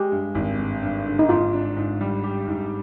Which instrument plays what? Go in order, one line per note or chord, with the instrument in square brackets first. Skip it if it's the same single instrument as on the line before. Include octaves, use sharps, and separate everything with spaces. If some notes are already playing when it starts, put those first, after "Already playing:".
Already playing: [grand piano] G#3 [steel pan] G4
[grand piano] G2
G#1
G2
G2
D3
[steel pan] D#4
[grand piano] G#2 [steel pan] F4
[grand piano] D4
G#2
G3
G4
G#2